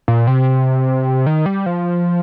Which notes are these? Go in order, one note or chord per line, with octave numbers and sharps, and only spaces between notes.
A#2
C3
D#3
G3
F3